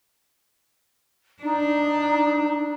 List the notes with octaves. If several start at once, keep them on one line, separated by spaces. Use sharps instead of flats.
D4 D#4